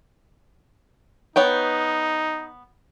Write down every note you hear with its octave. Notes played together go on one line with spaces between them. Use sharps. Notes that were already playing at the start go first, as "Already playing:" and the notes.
B3 D#4 C#5 G5